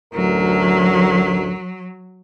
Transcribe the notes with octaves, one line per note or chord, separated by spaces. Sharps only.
A1 D2 F#3 A#4